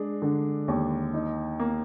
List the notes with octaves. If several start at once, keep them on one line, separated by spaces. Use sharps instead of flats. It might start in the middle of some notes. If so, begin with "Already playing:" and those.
Already playing: G#3 D4
D3
D#2
D#4
A#3